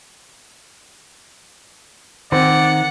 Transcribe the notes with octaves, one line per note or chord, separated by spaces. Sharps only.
D#3 C4 D5 F#5